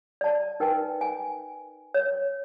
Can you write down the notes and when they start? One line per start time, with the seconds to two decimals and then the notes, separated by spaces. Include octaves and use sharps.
0.21 D5 A5
0.60 D#4 A#4 B4 G5 G#5
1.01 G#5
1.94 C#5